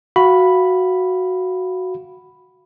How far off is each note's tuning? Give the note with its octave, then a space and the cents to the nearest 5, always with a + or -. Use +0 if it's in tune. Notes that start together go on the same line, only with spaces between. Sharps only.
F#4 +0 F5 -20 B5 +0